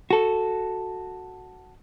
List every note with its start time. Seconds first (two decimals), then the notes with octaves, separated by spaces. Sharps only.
0.11 F#4 A4